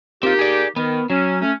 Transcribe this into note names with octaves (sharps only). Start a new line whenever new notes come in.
A#3 C4 D#4 F4 G4
G#4 D5
D#3 B3
F#3 C#4
A3 C#4